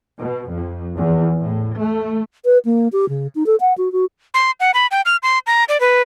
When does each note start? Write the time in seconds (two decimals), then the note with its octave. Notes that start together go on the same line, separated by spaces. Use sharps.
0.19 B2
0.50 F2
0.98 E2
1.39 A2
1.77 A3
2.45 B4
2.65 A#3
2.93 G4
3.09 C#3
3.35 D#4
3.46 A4
3.60 F#5
3.78 F#4
3.92 F#4
4.34 C6
4.60 F#5
4.74 B5
4.91 G5
5.06 F6
5.23 C6
5.47 A#5
5.69 D5
5.80 B4